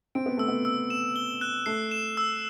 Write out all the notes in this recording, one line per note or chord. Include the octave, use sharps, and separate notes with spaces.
C4 D7
B3
A3 E6
B3
E6
E7
G7
F#6
A3 C7
E7
E6